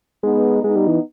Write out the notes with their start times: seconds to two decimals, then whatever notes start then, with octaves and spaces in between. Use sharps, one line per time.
0.23 G#3 B3 D#4
0.63 G#3 B3 D#4
0.76 G3
0.87 E3